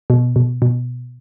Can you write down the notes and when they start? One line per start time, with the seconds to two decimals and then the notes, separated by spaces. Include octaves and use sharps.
0.10 B2
0.36 B2
0.62 B2